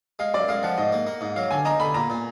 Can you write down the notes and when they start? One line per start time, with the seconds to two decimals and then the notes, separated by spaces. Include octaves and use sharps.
0.19 G#3 F5
0.34 F#2 D5
0.48 G#3 F5
0.63 F3 F#5
0.78 G#2 D#5
0.92 A#3
1.07 A#3
1.21 G#2
1.36 F#3 F5
1.51 D3 G#5
1.65 D#4 A#5
1.80 D3 B5
1.94 A#2 A#5
2.10 A#2